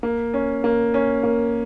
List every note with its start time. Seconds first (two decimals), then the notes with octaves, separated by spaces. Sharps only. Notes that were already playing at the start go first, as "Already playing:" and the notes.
0.03 A#3
0.34 C#4
0.64 A#3
0.94 C#4
1.23 A#3